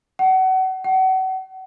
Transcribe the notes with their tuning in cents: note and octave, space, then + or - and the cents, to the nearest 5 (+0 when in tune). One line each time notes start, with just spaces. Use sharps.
F#5 +30
F#5 +35